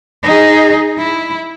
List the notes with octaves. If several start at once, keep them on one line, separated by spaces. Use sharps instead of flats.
D#4 G#4
E4